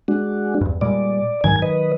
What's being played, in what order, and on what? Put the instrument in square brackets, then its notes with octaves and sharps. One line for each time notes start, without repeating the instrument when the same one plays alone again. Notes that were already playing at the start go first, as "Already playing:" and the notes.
[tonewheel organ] G#3 D4 F#4
[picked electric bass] E2 G2
[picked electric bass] A#2 G3 G#3 [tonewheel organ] D5
[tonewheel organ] G#2 G#5 G#6 [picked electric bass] D#3 F#3
[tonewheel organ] B4 D#5